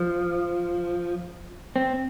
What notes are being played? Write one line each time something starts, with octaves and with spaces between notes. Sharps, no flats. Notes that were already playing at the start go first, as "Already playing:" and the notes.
Already playing: F3
C4